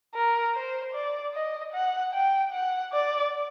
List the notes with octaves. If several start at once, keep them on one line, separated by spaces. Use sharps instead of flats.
A#4
C5
D5
D#5
F#5
G5
F#5
D5